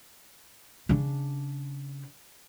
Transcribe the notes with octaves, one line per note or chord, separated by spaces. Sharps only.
C#3 D4